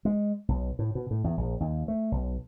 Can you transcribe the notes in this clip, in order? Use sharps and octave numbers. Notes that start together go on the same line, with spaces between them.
G#3
B1
A2
B2
A2
E2
A#1
D#2
A3
B1